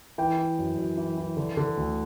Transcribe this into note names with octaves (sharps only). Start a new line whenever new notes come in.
E3 G5
E3
F#2
F#2
E3
E3
D3
D3
D2